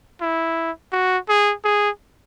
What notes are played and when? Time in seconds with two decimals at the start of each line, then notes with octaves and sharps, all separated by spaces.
0.21 E4
0.93 F#4
1.29 G#4
1.65 G#4